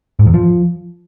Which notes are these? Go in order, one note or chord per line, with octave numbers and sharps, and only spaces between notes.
G#2
E2
F3